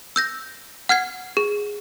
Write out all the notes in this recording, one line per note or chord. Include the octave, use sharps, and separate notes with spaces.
E6 G6 A#6
F#5 F6 G#6 C7
G#4